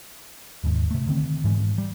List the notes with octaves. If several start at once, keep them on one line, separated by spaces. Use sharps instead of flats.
E1 D#2 G#2
C3 A3
D3 D#3 C4
G#2 E3 G#3
G3